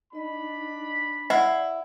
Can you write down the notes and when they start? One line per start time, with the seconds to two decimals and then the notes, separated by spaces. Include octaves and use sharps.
0.13 D4 D#4 D#5 B5
1.30 E4 D5 F#5